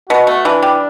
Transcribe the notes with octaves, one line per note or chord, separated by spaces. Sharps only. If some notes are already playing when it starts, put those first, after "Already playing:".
B2 F#4
A3
E3 D4
G3